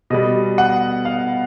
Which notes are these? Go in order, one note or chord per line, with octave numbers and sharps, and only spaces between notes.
B2 G3 B3 D#5
F#5
F5